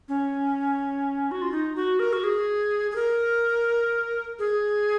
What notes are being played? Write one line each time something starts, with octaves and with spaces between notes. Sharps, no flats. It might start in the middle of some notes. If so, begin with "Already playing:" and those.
C#4
F#4
F4
D#4
F#4
A#4
F#4
G#4
G#4
A#4
G#4